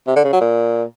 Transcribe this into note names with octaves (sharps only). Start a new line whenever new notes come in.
C3
D3
C#3
F#3
A#2